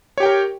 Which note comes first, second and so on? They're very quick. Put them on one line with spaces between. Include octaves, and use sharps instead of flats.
C#5 G4 G5 A#4